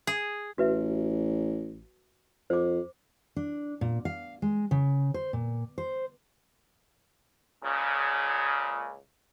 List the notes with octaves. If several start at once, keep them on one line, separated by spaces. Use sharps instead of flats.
G#4
A1 F#4 B4 E5
F2 C5 D6
D4
A#2
F5
G#3
C#3
C5
A#2
C5
C#2 A#2 C#3